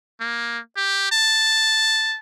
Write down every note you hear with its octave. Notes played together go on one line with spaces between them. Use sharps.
A#3
G4
A5